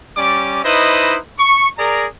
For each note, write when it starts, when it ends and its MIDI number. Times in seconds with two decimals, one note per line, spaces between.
0.16 0.62 55
0.16 0.62 61
0.16 0.62 74
0.16 0.62 86
0.64 1.18 63
0.64 1.18 64
0.64 1.18 71
0.64 1.18 72
0.64 1.18 75
1.38 1.68 85
1.78 2.06 68
1.78 2.06 70
1.78 2.06 74
1.78 2.06 82